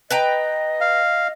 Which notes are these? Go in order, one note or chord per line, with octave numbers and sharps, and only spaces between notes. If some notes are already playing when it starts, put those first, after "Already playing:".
B4 D#5 G5 A#5
F5